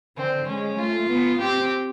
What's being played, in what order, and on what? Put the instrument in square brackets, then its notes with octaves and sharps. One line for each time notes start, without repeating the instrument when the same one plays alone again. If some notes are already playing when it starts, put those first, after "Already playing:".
[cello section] D3 [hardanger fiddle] C4
[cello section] G#3 [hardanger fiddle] C#4
[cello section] A3 [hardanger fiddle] F4
[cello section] B3
[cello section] C4 [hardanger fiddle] G4